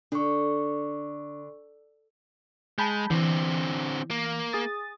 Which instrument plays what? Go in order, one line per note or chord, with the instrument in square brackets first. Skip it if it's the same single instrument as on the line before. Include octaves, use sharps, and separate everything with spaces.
[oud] D3 [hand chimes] D4 C#6
[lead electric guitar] G#3 [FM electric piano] A5 B5 G6
[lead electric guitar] D3 C4 [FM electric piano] E3
[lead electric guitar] A#3
[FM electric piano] G#4 D#6 A6